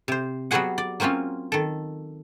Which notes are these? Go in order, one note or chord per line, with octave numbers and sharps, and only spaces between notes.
C3 C5
F#3 G3 B3 F#4 G#4 F#5
D5
F#3 A#3 C4 C#4 F4
D#3 A4